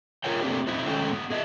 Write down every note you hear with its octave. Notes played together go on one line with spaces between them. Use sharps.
F4 G#4 A#4 C#5 G5
A3 A#3 C4 D4 G4
C4 D#4 E4
D#3 G#3 A3 C#4 A4 G5
G#2 B3
G#4 D#5 E5